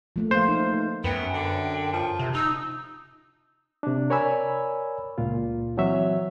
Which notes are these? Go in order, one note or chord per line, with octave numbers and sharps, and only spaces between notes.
F3 A3 A#3
B4 C5 F5
D#4
F#2 B3 G5
D3
F3
C3
D#4 E6
C3 D4
A#4 C#5 D5 G#5 B5 E6
C#2 A#2 F4
E3 F#3 C4 C#5 E5